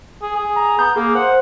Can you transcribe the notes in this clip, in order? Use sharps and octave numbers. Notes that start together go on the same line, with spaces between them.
G#4
G#4
A#5
B3 G6
A#3 G#4
C5 F#5